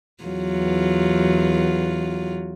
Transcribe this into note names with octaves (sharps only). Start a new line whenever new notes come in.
E2 F#3 F4